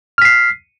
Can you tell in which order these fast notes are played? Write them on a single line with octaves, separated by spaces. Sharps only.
F6 B6 C7